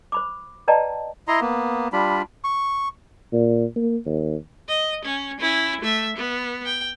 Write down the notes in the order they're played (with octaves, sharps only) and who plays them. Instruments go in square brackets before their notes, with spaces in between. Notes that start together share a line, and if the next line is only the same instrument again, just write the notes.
[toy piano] C5 B5 D6
B4 D5 D#5 G5 A5 A#5
[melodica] E4 D#5 A#5 C6
A#3 B3
G3 D4 F4 B5
C#6
[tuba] A#2
A#3
D#2
[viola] D#5
C#4
C#4 E4
A3 E5
B3
G5